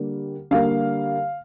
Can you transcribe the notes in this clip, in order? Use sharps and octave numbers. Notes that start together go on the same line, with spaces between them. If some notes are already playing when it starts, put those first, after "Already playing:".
Already playing: D3 G3 A#3
D3 G3 A#3 F5